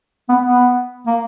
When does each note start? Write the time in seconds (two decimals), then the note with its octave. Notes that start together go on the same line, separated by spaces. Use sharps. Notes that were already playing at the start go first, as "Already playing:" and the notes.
0.29 B3
0.45 B3
1.07 A#3